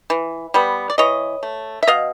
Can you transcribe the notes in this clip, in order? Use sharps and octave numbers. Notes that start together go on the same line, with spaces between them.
E3
G3 B3
D5
E3 C#5 D#5
A3
E5
B2 D#5 F5